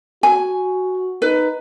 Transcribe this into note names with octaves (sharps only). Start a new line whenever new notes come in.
F#4 G#5
D#4 B4